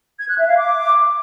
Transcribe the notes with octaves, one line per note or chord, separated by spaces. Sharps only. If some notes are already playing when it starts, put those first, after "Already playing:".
G#6
F#6
E5
F5
D6